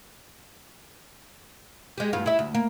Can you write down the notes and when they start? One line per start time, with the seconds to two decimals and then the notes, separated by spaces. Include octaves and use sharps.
1.98 G#3 G4
2.13 E2 G2 F4
2.26 E4 E5
2.39 D2
2.55 A#3